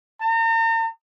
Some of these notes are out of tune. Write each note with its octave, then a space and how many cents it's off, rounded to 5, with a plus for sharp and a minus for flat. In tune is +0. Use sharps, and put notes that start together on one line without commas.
A#5 -40